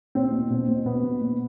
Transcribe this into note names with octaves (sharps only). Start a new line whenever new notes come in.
B2 C4
B2
B2
B2
B2 B3
B2
B2